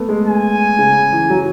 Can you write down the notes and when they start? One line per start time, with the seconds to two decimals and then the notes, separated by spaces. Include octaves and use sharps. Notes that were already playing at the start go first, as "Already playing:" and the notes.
Already playing: A3 B3
0.09 G#3
0.27 G#5
0.79 C#3
1.13 E3
1.30 F#3